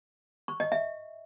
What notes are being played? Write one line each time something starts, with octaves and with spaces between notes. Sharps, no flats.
C#6
D#5
E5